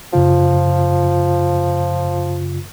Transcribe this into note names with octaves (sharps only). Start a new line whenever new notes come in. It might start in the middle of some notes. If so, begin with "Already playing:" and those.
F#2 C#3 F3 F4